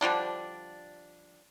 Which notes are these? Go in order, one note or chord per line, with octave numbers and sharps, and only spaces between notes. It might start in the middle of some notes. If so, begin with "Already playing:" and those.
D3 F3 G3 D4